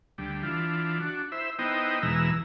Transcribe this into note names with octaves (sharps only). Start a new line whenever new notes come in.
D2 G3
E3 D4 F4
D4 F#4
E4 C5 E5
B3 D#4 E4 C5 D#5 G5
E2 B2 E3 G#3 A#5 E6